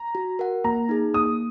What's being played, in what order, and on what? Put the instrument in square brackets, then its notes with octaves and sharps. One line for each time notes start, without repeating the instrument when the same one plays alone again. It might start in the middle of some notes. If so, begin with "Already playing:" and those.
Already playing: [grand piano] A#5
[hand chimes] F#4
A#4 F#5
[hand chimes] A#3 [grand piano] A#5
[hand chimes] D#4 G#4
[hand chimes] A#3 [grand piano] D#6